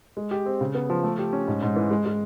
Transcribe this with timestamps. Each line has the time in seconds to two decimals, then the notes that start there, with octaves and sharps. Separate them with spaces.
0.17 G#3
0.31 G4
0.46 C4
0.61 C#3
0.75 B3
0.90 F3
1.03 A3
1.19 G4
1.33 C#4
1.47 G#2
1.62 G#2
1.76 E3
1.91 G#3
2.05 G#3